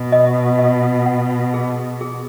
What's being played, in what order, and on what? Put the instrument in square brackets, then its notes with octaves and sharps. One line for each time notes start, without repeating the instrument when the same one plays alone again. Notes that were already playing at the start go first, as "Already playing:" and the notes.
Already playing: [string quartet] B2
[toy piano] D#5
D#5
F#5
G#4
G#4